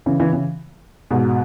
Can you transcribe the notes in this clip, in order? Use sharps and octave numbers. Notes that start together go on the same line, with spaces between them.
C#3 E3
C#3 E3
C#3 E3
G#2 B2